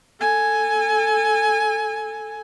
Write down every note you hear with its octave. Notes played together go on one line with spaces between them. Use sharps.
A4 G#5